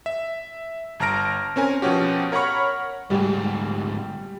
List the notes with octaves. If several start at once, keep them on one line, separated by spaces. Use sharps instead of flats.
E5
G1 A5 A#5 F6 A#6 D7
C4 C#4 A#4 G#5
B2 F3 C#4 F#4 G4
A#4 C#5 F#5 B5 C#6 F6
D2 G#2 G3